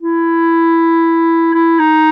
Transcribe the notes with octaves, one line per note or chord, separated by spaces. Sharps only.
E4
E4
D#4